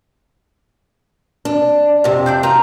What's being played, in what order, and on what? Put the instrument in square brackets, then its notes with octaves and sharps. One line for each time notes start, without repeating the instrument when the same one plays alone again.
[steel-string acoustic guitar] D4
F2 C3
[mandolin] D4 D6 G6
[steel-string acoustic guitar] F4 [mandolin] A#5